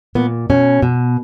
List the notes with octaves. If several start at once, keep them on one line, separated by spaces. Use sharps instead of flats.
A#2 B3
B2 C#4
B2